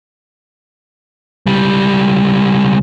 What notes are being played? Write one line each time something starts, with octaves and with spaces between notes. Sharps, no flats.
C#2 G3